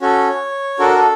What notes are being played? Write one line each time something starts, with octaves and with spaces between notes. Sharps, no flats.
C#4 F#4 A4 C#5
D4 F#4 A4 A#4
A4